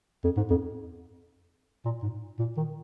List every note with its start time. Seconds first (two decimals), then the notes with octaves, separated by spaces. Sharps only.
0.24 F2
0.37 G#2
0.50 F2
1.86 A#2
2.03 G#2
2.39 A#2
2.57 D#3